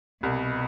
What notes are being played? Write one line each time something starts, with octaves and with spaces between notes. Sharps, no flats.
C2 B2